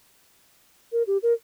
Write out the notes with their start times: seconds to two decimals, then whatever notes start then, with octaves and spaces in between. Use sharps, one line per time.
0.92 A#4
1.07 G4
1.23 A#4